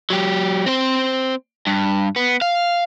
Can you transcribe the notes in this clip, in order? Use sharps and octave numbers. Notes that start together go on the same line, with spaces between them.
F#3 G4
C4 C5
G2
B3
F5